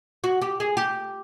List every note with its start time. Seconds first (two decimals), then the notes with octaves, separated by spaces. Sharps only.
0.24 F#4
0.42 G4
0.60 G#4
0.77 G4